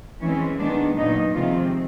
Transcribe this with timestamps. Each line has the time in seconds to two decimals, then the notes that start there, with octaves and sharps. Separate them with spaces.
0.21 E3 G#3 C4 C#4
0.58 D#3 G#3 B3 D4
0.96 A#2 D#3 F#3 B3 D#4
1.34 C3 D#3 F3 G#3 C4 F4